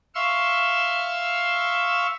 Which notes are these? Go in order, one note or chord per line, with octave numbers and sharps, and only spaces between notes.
E5 F5 C6 C#6 E6